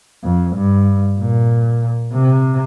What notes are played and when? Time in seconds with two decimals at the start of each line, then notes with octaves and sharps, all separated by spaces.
0.24 F2
0.56 G2
1.19 A#2
2.13 C3